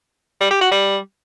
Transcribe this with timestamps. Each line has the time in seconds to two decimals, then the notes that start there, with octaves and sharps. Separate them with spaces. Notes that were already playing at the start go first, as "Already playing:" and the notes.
0.40 G3
0.51 G4
0.61 F#4
0.71 G3